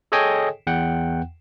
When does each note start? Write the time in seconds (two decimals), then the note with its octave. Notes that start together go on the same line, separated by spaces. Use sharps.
0.12 G#4 A4 C#5 D#5 G5 G#5
0.67 E2 F#5 G5